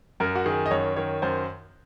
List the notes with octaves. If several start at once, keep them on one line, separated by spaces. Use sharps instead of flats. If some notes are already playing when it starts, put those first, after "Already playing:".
F#2 A#4
F#4
D#3 G#4
D#5
F#2 C#5
D#3 C#5
F#2 C5